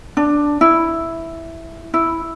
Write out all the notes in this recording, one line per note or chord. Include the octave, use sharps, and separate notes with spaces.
D4
E4
E4